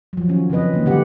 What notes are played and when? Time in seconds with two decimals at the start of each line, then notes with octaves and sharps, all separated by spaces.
0.13 F3 F#3
0.29 D#3 F#3 C#4
0.50 C#3 F3 C4 B4 D#5
0.73 D#3 G#3 A#3
0.86 D3 D#3 F#3 G4 B4 F#5